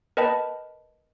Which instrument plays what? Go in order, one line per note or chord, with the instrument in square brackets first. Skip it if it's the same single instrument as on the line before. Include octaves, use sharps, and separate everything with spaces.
[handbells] A#4 B4 D#5 G5 A5 B5